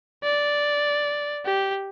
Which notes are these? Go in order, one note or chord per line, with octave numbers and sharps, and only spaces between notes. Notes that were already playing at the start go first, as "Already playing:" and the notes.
D5
G4